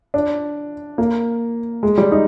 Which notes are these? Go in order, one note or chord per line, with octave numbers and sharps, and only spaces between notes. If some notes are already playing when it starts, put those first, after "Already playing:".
D4
A#3
G#3
G3
D#4